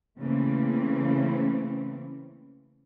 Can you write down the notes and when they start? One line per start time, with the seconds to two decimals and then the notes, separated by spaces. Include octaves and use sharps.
0.18 C#3 E3 A3 A#3 C4 C#4